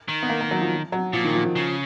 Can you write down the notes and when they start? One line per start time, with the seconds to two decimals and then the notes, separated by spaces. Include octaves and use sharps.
0.08 D#3
0.23 B3
0.29 A#3
0.41 A#3
0.51 F#3
0.61 F3
0.92 F#3
1.13 A#2 F3
1.24 D#3
1.35 F3
1.45 F3
1.56 C#3